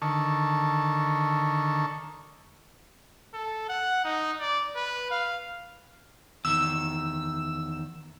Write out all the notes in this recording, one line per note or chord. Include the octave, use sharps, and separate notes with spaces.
D3 D#3 A5 C#6
A4
F#5
D#4
D5
B4
F5
E2 D#3 E6